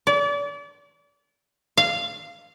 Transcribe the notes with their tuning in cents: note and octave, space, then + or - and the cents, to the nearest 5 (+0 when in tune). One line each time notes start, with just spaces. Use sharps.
D5 -35
F5 -15